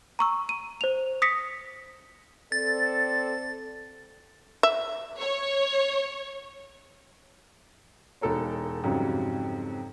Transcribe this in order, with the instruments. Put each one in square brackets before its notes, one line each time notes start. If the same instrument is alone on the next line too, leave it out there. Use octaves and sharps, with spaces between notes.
[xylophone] A#5 C#6 E6
D#7
C5 F7
D#6 A#6 B6 C#7
[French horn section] C4 A4 D5 [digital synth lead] A6
[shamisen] E5
[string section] C#5
[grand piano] E1 D#4 A4 A#4 C#5
F2 G#2 C#3 F#3 G3